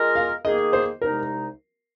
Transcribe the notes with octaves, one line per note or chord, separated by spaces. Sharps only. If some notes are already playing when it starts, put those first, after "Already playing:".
Already playing: G#3 F4 A#4 D#5
F5
D#3 A#3 G#4 D#5
C5
C2 C3 G#3 D#4 A#4